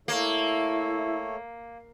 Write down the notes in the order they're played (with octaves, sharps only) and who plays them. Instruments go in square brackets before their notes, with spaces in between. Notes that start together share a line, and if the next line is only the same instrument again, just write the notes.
[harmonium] A3 A4 C#5 [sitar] A#3 [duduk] E4